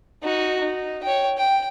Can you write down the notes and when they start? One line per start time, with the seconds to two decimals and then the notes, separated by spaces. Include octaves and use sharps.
0.23 D#4 F#4
0.61 D#4
1.04 C#5 G5
1.38 G5